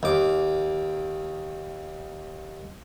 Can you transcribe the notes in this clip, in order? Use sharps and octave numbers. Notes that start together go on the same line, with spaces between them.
D#2 D6